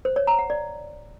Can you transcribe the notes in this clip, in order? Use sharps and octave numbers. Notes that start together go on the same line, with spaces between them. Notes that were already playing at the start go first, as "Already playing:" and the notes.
C5
C#5
A#5
F#5
D5